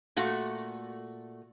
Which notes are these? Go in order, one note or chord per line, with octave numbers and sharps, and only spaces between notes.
A#2 A3 F#4